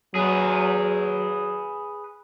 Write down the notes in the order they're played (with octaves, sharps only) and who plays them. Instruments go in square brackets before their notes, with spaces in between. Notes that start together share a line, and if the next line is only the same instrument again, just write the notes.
[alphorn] F#3 [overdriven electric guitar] G#4 B4